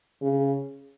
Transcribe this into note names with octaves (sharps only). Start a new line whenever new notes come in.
C#3